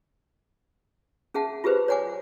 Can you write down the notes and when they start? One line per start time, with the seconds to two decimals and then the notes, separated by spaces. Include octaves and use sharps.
1.34 C#4 G#4 E5 F#5 A5
1.64 F4 G4 G#4 B4 C5
1.88 C#5 D5 F#5 G#5 D6